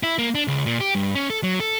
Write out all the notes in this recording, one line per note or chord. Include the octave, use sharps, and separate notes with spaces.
E4
A#3
D4
C#2
A#2
G4
G2
C#4
A4
F#3
A4